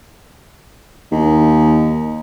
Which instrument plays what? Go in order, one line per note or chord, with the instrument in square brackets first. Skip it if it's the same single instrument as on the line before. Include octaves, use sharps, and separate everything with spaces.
[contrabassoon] D#2